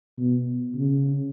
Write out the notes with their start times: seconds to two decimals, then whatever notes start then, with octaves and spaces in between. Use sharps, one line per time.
0.17 B2
0.76 C#3